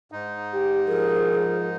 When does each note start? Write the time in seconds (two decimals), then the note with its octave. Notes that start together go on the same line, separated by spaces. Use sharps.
0.12 G#2 D#4
0.53 G4
0.87 F3 G#4 A#4